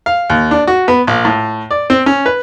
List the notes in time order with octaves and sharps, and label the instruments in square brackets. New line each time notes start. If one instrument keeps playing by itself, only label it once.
[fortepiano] F5
D#2
D4
F#4
B3
A#1
A2
D5
C4
C#4
B4